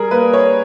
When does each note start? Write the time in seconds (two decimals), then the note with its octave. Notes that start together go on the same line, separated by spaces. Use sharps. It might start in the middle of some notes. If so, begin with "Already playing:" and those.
Already playing: G3 G#4 A#4
0.11 A#3 B4
0.33 C#5